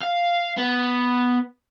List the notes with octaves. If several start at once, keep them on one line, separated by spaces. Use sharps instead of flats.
F5
B3